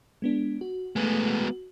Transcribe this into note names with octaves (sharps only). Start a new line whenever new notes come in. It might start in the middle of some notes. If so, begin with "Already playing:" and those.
G#3 B3 D4
F#4
G#3 A3 B3